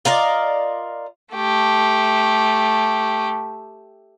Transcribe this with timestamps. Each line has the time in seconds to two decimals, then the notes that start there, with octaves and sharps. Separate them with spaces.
0.05 F4 A#4 D5 D#5
1.34 A3 G4